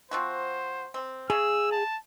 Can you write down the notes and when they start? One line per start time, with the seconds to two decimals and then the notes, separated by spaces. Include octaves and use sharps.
0.11 F3 C4 F#4 C5
0.94 C4
1.30 C#3 G#4 E6
1.72 A5